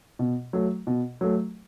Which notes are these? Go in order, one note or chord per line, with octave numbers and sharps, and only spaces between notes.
B2
F#3 A3
B2
F#3 A3